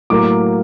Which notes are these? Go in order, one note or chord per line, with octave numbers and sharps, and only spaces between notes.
A2 F#3 A#3 D6